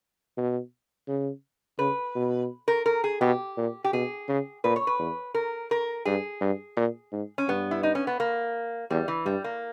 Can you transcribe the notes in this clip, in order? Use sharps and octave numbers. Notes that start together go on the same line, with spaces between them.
B2
C#3
C#3 B4
B2
A#4
A#4
G#4
B2 G4
A#2
G4
B2 G#4
C#3
A#2 B4
C#5
B4
E2
A#4
A#4
G2 G#4
G2
A#2
G#2
C#4
G2 B3
E4
D#4
C#4
B3
A#3
E2 G3
E3
G2 G3
A#3